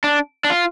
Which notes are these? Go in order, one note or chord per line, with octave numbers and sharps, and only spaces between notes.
D4
D4
F4